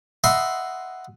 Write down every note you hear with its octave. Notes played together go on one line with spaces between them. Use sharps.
D#5 E5 F#5 B5 C6